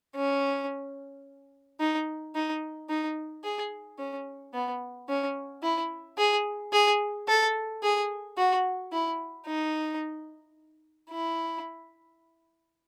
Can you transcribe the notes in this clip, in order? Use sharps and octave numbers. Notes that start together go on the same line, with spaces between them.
C#4
D#4
D#4
D#4
G#4
C#4
B3
C#4
E4
G#4
G#4
A4
G#4
F#4
E4
D#4
E4